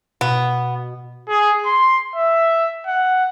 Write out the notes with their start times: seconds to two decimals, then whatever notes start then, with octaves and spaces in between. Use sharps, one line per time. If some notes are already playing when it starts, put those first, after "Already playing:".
0.21 B2 B3
1.29 G#4
1.66 C6
2.16 E5
2.87 F#5